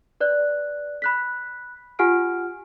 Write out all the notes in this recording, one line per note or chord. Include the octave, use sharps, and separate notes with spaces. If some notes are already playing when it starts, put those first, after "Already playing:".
B4 D5 F#6
B5 F#6 B6
F4 G4 F#5 G#5 F6 D7